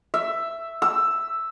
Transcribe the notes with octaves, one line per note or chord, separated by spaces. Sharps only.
E5
E6